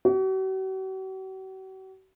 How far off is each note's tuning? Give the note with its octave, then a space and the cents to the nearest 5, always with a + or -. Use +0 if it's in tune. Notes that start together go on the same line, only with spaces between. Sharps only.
F#4 +45